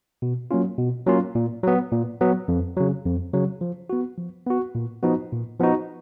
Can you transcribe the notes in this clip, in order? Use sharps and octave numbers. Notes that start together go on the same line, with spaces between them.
B2
F#3 A#3 C#4 F4
B2
F#3 A#3 C#4 F4
A#2
F#3 B3
A#2
F#3 B3
F2
C#3 F#3
F2
C#3 F#3
F3
B3 F#4
F3
B3 F#4
A#2
F3 B3 D#4 F#4
A#2
F3 B3 D#4 F#4